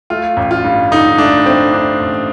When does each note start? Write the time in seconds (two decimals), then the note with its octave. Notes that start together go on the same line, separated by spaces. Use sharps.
0.10 A3 F4
0.37 A1
0.51 F4
0.64 G2
0.91 D3 D#4
1.18 A3 D4
1.45 A3 C4
1.72 A3 D4
2.00 A1